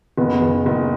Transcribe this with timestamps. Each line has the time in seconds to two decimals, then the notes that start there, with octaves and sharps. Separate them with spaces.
0.18 F#1 B3
0.42 F#1
0.66 F#1